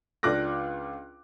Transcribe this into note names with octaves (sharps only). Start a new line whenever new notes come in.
C#2 D4 F4 D6 F#6 A#6